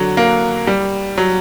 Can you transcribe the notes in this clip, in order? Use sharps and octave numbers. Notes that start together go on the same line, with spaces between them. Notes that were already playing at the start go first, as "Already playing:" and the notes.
Already playing: D3 F#3
A#3
G3
F#3